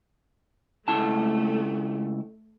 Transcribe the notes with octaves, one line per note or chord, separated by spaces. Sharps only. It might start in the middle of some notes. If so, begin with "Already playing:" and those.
C#2 A3 E4 A5